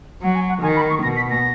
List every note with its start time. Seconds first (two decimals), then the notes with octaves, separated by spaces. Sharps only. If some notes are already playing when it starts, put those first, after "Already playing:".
0.22 F#3 F#5
0.35 G#5
0.49 F#5
0.62 D#3 G#5
0.76 B5
0.90 C#6
1.03 B2 A#6
1.16 B6
1.30 A#6